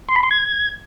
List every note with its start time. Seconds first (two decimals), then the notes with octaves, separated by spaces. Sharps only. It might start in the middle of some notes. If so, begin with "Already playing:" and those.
0.09 C6
0.16 B5
0.23 C6
0.31 G#6